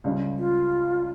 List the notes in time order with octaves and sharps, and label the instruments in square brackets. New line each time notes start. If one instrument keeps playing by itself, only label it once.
[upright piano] C#2 C#3 G3 D4
[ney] F4